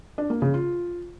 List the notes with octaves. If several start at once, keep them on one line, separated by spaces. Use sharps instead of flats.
D4
A#3
C#3
F4